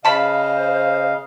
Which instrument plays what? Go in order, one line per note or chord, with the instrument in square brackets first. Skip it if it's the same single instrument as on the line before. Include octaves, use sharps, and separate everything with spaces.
[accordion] C#3 D#5 F5 [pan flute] C5 [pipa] A5 B5